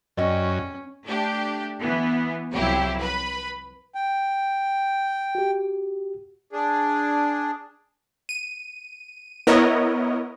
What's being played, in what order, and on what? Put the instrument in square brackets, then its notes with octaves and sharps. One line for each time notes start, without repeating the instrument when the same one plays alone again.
[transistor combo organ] F#2 [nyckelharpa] C#4 [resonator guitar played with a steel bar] D5 D#5 G5
[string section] A3 D4 G4
E3 B3
C2 F2 F#3 E4 G4
B4 B5
[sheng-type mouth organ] G5
[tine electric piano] F#4 G4
[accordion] D4 G#4
[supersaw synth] D#7
B3 E4 A#4 C#5 D#5